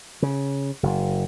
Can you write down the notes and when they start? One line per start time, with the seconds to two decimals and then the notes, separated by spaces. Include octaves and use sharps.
0.22 C#3
0.83 F#1